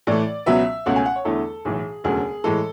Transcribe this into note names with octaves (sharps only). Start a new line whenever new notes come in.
A2 E3 A3 D5
C#2 B2 F#3 B3 E5
C#2 B2 A3 C#4 F#5
G#5
F#5
C#5
E2 D3 A3 E4 A4
B1 A2 E3 G#4
E1 D2 C#3 F#3 A3 G#4
A2 E3 G#3 A4